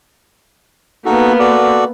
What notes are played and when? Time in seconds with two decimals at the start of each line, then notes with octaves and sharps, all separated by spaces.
1.05 A#3 B3 D#4 F#4 A4
1.40 F#4 A4 D5